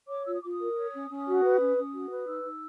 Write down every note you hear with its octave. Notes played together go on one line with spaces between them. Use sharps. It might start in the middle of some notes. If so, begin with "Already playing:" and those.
C#5 D6
F4 E6
D#6
F4 D6
D#6
A#4
C#5
C#4
C#4
F#4
B4
C#4
C#4
F#4
B4
D#4 E6
D#4